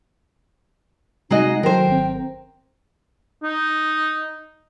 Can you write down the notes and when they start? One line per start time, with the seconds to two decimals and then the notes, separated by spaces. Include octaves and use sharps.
1.30 C3 G#3 D#4 F#4 D#5 A#5 C7
1.63 D#3 F#3 A4 A#4 C5 G5
1.88 G#1 C4
3.43 D#4